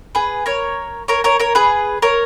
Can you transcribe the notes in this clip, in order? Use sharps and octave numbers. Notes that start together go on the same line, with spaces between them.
G#4 B4
A#4 C#5
A#4 C#5
A#4 C#5
A#4 C#5
G#4 B4
A#4 C#5